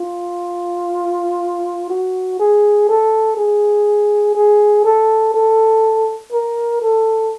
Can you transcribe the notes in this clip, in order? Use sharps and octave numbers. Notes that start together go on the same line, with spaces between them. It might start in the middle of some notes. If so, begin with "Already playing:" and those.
Already playing: F4
F#4
G#4
A4
G#4
G#4
A4
A4
A#4
A4